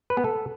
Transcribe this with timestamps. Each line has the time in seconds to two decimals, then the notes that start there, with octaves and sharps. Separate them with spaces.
0.10 B4
0.17 B3
0.24 A4